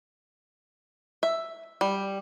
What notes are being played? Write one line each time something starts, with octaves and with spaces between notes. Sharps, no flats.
E5
G3